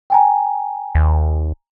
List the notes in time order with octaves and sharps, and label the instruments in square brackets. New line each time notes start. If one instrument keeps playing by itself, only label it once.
[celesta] G5 G#5 A#5
[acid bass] D#2